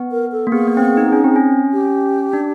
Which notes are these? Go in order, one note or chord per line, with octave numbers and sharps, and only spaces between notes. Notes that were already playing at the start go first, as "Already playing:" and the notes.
Already playing: B3
A#4
A4
A#3
B3 G#4
A#3
C4
B3
D#4
C#4
C4
C#4
G4
D4